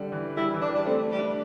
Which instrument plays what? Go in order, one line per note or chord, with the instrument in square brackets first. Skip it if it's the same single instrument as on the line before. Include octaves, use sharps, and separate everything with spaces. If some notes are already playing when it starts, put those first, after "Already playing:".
Already playing: [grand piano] D3 G3
E3
[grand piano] G3 [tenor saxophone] E4
[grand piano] E3
[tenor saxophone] D4
[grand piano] G3
[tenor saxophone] D4
[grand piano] A3 [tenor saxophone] C4
[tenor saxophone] G3
[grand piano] D4